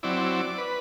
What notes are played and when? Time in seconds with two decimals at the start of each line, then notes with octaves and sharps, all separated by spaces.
0.03 F#3 C4 E4 D5
0.58 B4